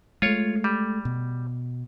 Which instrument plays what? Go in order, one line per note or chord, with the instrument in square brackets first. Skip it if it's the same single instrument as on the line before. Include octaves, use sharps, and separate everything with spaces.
[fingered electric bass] G#3 A3 [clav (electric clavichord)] F4 C#5
[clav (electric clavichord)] G3
[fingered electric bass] B2